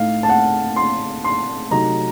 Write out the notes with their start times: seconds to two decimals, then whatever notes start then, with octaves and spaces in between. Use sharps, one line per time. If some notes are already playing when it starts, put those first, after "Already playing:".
Already playing: A2 A3 D#4 F5
0.23 A5
0.29 F#5
0.76 C6
1.24 C6
1.71 C3 F#3 A3 D#4 A#5